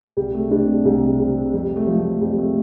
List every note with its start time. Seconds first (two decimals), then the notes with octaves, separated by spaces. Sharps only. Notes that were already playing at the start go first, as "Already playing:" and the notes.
0.17 C2 G3
0.34 A3
0.51 C3 G3 D4
0.85 C2 G3
1.19 C3 G3
1.53 F2 G3
1.76 A3
1.87 F3
1.99 A3
2.21 F2 G3
2.39 A3